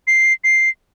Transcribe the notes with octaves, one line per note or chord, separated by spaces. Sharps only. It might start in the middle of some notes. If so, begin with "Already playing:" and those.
C7
C7